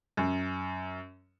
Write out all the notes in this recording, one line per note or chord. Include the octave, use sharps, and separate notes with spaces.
F#2